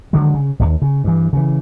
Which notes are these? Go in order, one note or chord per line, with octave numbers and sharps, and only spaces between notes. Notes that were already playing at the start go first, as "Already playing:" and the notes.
D3 D#3 F#3 G#3
C#3
E1 D#2
C#3
G2 E3
C#3 E3